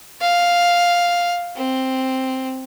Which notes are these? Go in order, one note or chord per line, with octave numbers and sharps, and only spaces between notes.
F5
C4